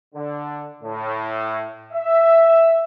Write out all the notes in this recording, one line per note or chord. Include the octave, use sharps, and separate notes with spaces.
D3
A2
E5